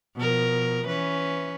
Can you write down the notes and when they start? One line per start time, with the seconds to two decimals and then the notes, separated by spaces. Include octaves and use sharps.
0.16 B2 F3 A#4
0.87 E3 C#4 B4